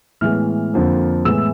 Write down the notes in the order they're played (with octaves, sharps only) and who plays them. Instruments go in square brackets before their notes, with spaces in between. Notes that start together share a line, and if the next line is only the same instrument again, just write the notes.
[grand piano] A2 E3 G#3 B3 F6
F2 D3 F3 A#3
A2 E3 G#3 B3 E6